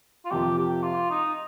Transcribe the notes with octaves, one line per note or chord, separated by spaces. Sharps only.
F4
F2 C3 F3 A#3 G4
G4
F4
D#4